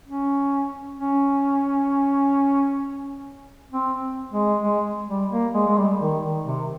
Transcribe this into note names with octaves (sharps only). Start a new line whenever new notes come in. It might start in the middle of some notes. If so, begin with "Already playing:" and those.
C#4
C#4
C4
G#3
G#3
G3
A#3
G#3
G#3
G3
D#3
D#3
C3